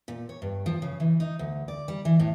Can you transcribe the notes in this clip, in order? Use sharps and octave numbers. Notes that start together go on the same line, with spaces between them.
A#2
C#5
G2
F3
C#3
E3
D#4
D2
D5
G3
E3
A2